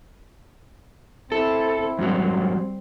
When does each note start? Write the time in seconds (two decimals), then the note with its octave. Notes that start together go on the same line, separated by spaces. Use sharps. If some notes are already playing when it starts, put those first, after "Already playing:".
1.32 C4 E4 A4
1.99 F2 G#2 F#3 G3 C4